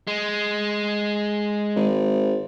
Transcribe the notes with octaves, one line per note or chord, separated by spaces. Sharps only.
G#3
G#1